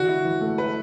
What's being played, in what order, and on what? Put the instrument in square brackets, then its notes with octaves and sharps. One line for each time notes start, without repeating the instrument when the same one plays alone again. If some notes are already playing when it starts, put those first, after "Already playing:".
Already playing: [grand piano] D3 E3 [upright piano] F#4
[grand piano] E4
E3
A3
[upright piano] B4